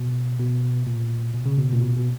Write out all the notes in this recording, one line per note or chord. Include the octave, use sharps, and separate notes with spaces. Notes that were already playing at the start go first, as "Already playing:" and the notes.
Already playing: B2
B2
A#2
B2
C#3
B2
A#2
B2
B2